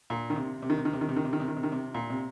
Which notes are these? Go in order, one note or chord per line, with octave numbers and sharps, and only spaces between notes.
A#2
D#3
C3
C3
D#3
C3
D#3
C3
D#3
C3
D#3
C3
D#3
C3
D#3
C3
D#3
C3
A#2
C3